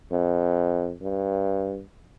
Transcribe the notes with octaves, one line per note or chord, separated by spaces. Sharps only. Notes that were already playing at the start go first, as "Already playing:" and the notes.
F2
G2